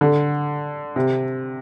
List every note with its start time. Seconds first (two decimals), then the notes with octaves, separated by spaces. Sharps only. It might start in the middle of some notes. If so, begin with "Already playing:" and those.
0.01 D3
0.96 C3